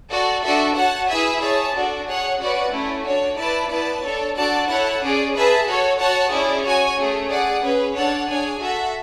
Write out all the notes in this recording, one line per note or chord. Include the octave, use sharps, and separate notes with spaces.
F#4 A4 D5
D4 F#4 A4 E5
F#4 C#5 F#5 A5
E4 G#4 B4 E5 G#5
G#4 C#5 E5 A5
D4 F#4 A4 D5
G#4 C#5 F#5
C#4 F#4 B4 D5 F#5
A3 C#4 E4
D4 F#4 C#5
E4 B4 D5 A5
B3 E4 B4 D5 A5
D4 A4 C#5
D4 F#4 A4 D5 A5
E4 A4 C#5 F#5
C#4 G#4 D5
G#4 B4 E5 A5
F#4 A4 C#5
F#4 C#5 F#5 A5
C#4 E4 G#4 D5
F#4 C#5 G#5
A3 C#4 G#4
G#4 D5 F#5
C#4 G#4 B4
D4 A4 C#5 F#5 A5
D4 G#4 C#5 G#5
F#4 A4 E5